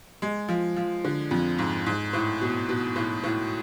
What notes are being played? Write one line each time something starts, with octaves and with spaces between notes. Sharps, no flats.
G#3
F3
F3
D3
F2
G#2
G#2
A2
B2
B2
A2
A2